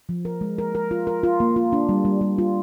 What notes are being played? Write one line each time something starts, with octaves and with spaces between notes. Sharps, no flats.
F3
A#4
G#3
A#4
A#4
F4
A#4
F4
A#3
F4
D4
G3
G3
G3
F4